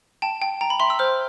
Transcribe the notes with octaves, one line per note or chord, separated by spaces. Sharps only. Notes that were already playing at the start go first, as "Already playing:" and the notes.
G5 A5
G5
G5 A#5
B5
E5 C6
E6
C5 F6